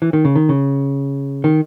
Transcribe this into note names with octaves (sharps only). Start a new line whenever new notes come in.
E3
D#3
C#3
D#3
C#3
D#3